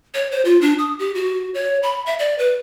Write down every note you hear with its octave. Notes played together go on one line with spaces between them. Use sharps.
C#5
C5
F4
D4
D#6
G4
F#4
C#5
B5
E5
D5
B4